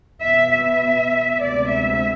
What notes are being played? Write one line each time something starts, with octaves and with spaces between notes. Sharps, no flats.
B2 B3 E5
E5
D2 C3 G#3 B3 D5
E5